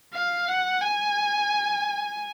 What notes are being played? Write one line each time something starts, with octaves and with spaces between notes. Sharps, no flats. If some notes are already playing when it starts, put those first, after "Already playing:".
F5
F#5
G#5